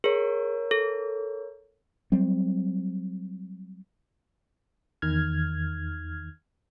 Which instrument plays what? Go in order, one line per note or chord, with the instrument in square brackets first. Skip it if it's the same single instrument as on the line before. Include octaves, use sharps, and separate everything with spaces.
[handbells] G#4 [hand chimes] A#4 C#5
[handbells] A4
[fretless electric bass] F#3 G3 C4
[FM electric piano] E2 D#3 F6 G#6